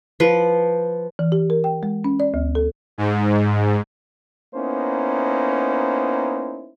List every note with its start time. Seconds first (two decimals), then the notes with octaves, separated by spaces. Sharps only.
0.20 F3 B4
1.19 E3
1.32 G4
1.50 A#4
1.64 G5
1.83 G#3
2.04 C#4
2.20 D5
2.34 D2
2.55 A4
2.98 G#2
4.55 A#3 B3 C#4 D#4 E4 C5